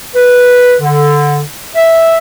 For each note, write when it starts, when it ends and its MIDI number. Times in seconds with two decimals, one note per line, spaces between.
0.15 0.74 71
0.80 1.42 50
1.76 2.18 76